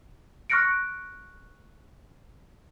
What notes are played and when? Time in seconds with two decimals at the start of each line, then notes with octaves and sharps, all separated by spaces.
0.50 C#6 F6 F#6 A#6 C#7 D7